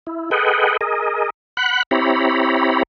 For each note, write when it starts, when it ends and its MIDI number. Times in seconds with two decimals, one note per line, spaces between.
0.07 0.30 64
0.31 0.77 68
0.31 0.77 69
0.31 0.77 71
0.31 0.77 75
0.31 0.77 78
0.31 0.77 79
0.81 1.30 68
0.81 1.30 70
0.81 1.30 75
1.57 1.83 78
1.57 1.83 83
1.57 1.83 90
1.91 2.83 60
1.91 2.83 64
1.91 2.83 67
1.91 2.83 73
1.91 2.83 82
1.91 2.83 83